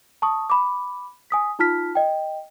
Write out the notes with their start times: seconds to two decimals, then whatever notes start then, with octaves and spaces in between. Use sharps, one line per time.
0.22 A5 C#6 D#6
0.50 B5 D6
1.30 G#5 D#6 B6
1.59 D#4 F4 A5 F6 B6
1.95 D#5 G5